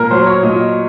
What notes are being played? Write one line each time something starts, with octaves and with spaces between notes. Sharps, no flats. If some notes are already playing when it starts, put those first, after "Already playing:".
Already playing: A#2 A#4
F#3 C5
C#5
A#2 D#5